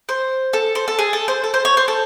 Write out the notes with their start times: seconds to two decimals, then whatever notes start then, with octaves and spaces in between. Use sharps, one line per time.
0.09 C5
0.53 A4
0.75 C5
0.88 A4
0.99 G#4
1.13 A4
1.28 C5
1.44 A4
1.54 C5
1.65 C#5
1.77 C5
1.88 A4